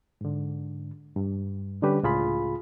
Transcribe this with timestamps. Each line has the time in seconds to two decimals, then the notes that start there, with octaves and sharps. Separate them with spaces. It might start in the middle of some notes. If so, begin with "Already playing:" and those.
0.21 G#2 D3
1.16 G2
1.82 D3 G3 C#4 D4 G4 B4
2.03 C#2 A2 F4 G#4 B5